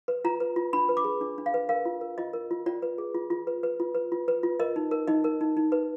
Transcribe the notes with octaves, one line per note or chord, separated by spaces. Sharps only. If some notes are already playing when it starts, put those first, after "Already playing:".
B4
F4 A#5
B4
F4
D4 B5
B4
D6
G#4
D4
D4
F5
B4
A#4 F5
F4
A#4
F4 D#5
A#4
F4
F4 D5
B4
G#4
F4
F4
B4
B4
F4
B4
F4
B4
F4
A#4 D#5
D#4
A#4
D#4 D#5
A#4
D#4
D#4
B4